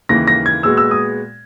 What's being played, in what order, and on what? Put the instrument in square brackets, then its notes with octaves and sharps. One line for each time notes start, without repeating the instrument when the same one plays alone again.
[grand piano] D#2 C#3 E3 A#3 [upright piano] A#6
[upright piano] A#6
G#6
[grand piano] A#2 G#3 B3 F#4 [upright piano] E6
[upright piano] E6
D#6